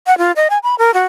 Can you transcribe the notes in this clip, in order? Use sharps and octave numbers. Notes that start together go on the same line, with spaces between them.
F#5
F4
D#5
G#5
B5
A#4
F#4